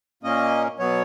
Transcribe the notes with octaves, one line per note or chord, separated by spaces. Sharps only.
A#2 A#3 C#4 D#5
B2 F#3 B3 C#5